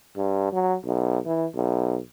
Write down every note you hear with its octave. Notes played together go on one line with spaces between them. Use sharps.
G2
F#3
B1
E3
B1